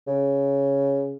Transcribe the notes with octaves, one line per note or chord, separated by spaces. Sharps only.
C#3